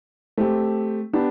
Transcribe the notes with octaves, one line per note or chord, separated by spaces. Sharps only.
A3 C4 G4
B3 D4 G4